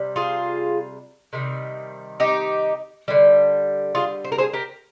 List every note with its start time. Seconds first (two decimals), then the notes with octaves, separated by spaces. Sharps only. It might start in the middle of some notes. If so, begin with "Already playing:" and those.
Already playing: C3 G3
0.16 F4 G#4
1.33 C3 D#3 G3
2.20 D#4 G4
3.08 D3 G3
3.95 F4 G#4
4.24 C5
4.32 A#4
4.38 G#4 C5
4.53 G4 A#4